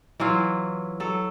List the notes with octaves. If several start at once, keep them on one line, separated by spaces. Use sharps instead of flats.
E3 F#3 E4 F4
F#3 A4